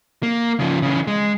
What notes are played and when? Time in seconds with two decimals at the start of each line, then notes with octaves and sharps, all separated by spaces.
0.23 A#3
0.60 C#3 F3
0.82 C#3 E3
1.07 G#3